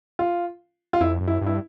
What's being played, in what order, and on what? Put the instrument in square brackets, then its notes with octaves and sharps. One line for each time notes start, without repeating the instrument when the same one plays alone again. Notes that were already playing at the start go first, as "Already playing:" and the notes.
[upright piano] F4
F4
[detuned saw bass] F2 [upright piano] E4
[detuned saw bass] F#2
[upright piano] E4
[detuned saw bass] G2
[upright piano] E4